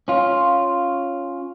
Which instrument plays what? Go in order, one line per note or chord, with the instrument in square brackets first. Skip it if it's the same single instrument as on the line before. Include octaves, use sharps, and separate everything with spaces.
[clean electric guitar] C#4 F4